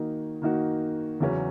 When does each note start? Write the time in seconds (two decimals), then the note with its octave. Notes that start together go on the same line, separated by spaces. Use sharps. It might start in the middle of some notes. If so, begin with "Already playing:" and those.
Already playing: D#3 A#3 D#4 F#4
0.42 D#3 A#3 D#4 F#4
1.20 E2 C#3 F#3 C#4